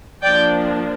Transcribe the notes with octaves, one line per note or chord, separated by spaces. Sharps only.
F3 A#3 D4 D5 G5